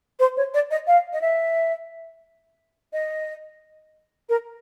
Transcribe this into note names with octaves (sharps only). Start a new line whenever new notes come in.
C5
C#5
D5
D#5
F5
D#5
E5
D#5
A#4